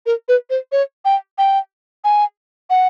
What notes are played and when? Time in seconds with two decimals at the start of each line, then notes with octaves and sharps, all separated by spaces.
0.06 A#4
0.29 B4
0.50 C5
0.72 C#5
1.05 G5
1.38 G5
2.04 G#5
2.70 F#5